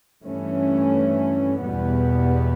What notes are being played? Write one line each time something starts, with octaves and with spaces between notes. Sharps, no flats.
G2 E3 A3 C#4
E2 B2 G3 B3